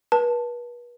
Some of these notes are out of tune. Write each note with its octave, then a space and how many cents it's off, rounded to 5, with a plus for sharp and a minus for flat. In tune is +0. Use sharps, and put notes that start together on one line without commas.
B4 -40 A5 +0